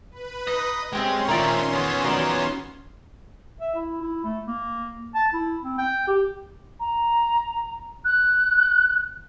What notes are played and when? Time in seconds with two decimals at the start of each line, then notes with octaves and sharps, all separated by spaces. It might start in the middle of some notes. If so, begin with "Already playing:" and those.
0.11 B4
0.47 D#4 D#5
0.93 G#3 C4 C#4 F4 G4 C6
1.28 A#2 D#3 C4 D#4 D5 E5 A#5
1.73 A#3 B3 G#4
2.04 F#3 D#4 F4 D5
3.61 E5
3.75 E4
4.01 E4
4.24 A3
4.47 A#3
5.15 A5
5.34 E4
5.64 C4
5.78 G5
6.08 G4
6.80 A#5
8.05 F#6